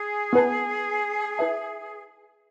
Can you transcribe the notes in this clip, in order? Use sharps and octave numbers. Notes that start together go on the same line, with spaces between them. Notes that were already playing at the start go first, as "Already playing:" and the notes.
Already playing: G#4
B3 E4 B4 F#5 A5
E4 B4 E5 A5